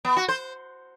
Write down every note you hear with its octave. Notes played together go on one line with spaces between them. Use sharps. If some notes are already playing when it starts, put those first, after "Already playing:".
B3
F#4
C5